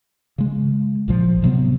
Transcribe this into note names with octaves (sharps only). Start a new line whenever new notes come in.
C#3 G#3
A#1 A#2 F3
A2 C3 F#3 B3